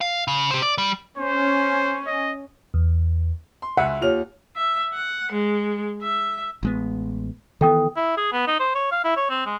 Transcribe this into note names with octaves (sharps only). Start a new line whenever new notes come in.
F5
C#3
G4 C5
D5
G3
C#4 C5
D#5
E2
C6
C#2 E5 F#5 G#5
D#2 F4 G4 C#5 F6 F7
E5
F#5
G#3
E5
A1 G#3 B3
D#3 E3 B3 A4 G5 D#6
E4
G#4
B3
D#4
C5
C#5
F5
E4
C#5
C4
G#3